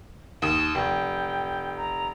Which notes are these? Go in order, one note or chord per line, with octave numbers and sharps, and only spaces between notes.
D#2 D#6 E7
F1 G5
A#5